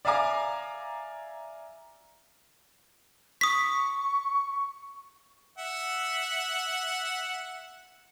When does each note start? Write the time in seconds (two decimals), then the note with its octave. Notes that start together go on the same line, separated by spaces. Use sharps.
0.05 D5 E5 F5 G#5 A#5 D6
3.41 C#6 D#6 B6
5.58 E5 F#5